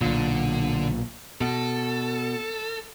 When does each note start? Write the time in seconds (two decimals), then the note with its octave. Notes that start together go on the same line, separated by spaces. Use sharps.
0.01 B1 A#2 D3
1.41 B2 A4